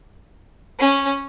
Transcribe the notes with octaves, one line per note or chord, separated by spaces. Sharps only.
C#4